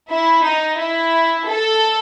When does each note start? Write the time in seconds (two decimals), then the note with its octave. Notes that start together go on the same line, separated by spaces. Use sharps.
0.10 E4
0.44 D#4
0.78 E4
1.48 A4